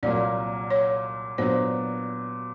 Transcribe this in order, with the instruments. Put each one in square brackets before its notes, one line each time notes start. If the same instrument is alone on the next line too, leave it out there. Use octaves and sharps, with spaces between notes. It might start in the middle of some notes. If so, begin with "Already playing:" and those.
[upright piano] C2 A#2 F#3 A#3 [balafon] D5
[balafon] C#5
[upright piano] A#2 F#3 B3 D4 [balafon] C5